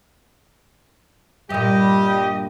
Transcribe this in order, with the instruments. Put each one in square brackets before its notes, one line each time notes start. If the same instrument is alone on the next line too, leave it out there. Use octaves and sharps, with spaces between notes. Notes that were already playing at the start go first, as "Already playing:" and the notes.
[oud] G2 A#2 [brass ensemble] G3 [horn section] G4 D#5